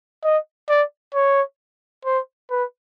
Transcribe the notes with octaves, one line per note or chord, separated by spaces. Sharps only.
D#5
D5
C#5
C5
B4